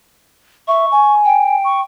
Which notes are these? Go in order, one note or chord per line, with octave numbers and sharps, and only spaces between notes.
E5 C#6
G#5
G5
C#6